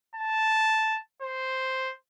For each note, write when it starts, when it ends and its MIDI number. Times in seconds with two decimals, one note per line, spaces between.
0.15 0.98 81
1.22 1.92 72